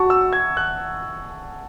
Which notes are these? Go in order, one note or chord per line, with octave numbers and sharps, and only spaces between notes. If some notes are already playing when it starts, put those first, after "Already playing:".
Already playing: F#4 F#5 A5 C#6
E6
G#6
F#6